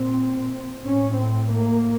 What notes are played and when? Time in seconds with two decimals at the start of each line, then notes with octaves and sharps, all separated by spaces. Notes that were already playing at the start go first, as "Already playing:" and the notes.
Already playing: A#2 C4
0.85 A2 C#4
1.20 C4
1.54 A#3